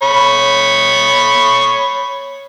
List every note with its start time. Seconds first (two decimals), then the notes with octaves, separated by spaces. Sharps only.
0.03 C#5 B5